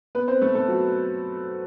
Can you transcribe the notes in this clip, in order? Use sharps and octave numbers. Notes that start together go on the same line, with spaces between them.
B3 B4
C4 C5
A3 A4
A3 A4
F#3 F#4